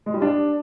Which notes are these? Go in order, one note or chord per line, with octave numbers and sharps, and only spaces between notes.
G#3
G3
D4